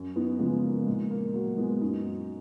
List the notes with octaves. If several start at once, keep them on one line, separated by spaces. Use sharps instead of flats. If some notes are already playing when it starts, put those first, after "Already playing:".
Already playing: F#2
B3 D#4
C#3 F3 G#3 B3
A#3
A#2 G#3
A#3
F#3 A#3
G#3 B3
F#2 D#4 F#4